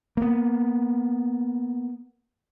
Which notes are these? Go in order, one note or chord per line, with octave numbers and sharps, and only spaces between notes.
A#3 B3